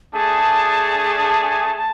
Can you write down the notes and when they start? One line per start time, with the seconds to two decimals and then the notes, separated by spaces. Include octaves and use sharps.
0.13 A3 D4 G#4 A5
1.76 A5